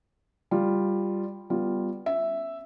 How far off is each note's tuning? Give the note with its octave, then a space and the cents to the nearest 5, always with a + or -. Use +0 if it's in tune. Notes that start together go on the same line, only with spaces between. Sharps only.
G3 +5 F4 +0
G3 +0 B3 +0 F4 +0
C#4 +0 E5 +0